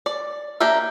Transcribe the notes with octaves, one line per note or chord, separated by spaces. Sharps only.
D5
A#3 D4 G4 A#4 E5